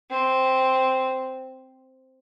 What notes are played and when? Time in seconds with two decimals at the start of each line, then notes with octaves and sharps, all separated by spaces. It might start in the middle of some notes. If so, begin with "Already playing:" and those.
0.11 C4